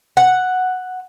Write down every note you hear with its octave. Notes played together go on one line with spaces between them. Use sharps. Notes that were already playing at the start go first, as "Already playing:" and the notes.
F#5